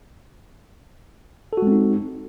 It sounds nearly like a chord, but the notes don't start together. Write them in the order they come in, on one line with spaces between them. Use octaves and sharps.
A4 F#4 G#3 C4 D#4